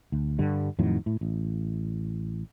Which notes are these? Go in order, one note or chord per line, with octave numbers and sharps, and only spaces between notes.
D2
G2 D3 G3
F2 A2 D#3 F#3
A2
A1